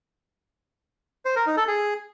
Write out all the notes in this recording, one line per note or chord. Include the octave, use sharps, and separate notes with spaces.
C5
A#4
D#4
A4
G#4